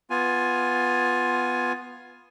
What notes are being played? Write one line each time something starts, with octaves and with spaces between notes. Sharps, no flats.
B3 F4 G#5